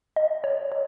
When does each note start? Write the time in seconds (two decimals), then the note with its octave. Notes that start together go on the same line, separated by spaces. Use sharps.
0.16 D#5
0.44 C#5
0.72 C#5